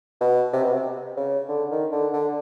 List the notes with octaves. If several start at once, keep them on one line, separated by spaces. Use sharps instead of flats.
B2
C3
B2
C3
C#3
D3
D#3
D3
D3